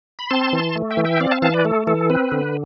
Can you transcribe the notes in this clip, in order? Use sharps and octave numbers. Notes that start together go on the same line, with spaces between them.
B5
C4 A5 C6
E3
A3
E5 G5
E3
E5 G5
C4 D5 F5
F5 A5
E3 F5 A5
B4 D5
A3 A4
E3 A4
C4 B4
D3